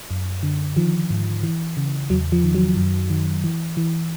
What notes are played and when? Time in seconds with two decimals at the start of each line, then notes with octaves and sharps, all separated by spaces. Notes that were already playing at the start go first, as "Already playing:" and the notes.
0.11 F#2
0.43 D3
0.76 D#3 F3
1.10 G#2
1.43 E3
1.77 C#3
2.10 E2 F#3
2.32 F3
2.44 D#3
2.55 F#3
2.77 F#2
3.10 D#3
3.44 E3
3.77 E3